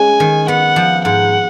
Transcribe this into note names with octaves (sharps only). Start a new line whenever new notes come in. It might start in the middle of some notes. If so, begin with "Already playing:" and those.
Already playing: G#3 C#4 G#5
D#3
B3 F#5
F3
G#2 F#5